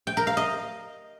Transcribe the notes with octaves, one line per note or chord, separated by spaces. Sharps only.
G5
A#4
F5
D#5